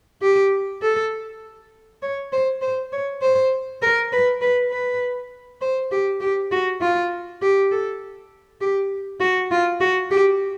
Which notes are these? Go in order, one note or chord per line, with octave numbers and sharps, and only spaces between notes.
G4
A4
C#5
C5
C5
C#5
C5
A#4
B4
B4
B4
C5
G4
G4
F#4
F4
G4
A4
G4
F#4
F4
F#4
G4